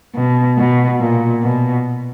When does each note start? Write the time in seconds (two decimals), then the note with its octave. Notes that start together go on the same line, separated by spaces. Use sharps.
0.15 B2
0.58 B2
1.00 A#2
1.42 B2